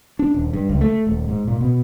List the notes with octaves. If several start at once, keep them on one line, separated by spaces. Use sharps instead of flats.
D4
D#1
G2
C#2
A3
D#1
G#2
A#2
B2